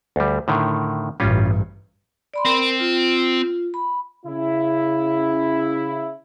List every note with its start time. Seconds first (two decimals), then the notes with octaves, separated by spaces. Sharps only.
0.16 D2 G3
0.48 A2 D3 D#3
1.20 A1 G2 G3 C#4 F4
2.34 D5 B5 C6
2.45 C4 A#4
2.80 F4
3.74 B5
4.26 C#3 E4